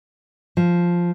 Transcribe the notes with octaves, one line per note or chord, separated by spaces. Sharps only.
F3